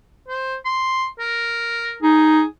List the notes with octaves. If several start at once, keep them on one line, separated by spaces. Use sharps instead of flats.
C5
C6
A#4
D#4 G#4